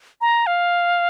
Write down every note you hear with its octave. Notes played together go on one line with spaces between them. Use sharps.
A#5
F5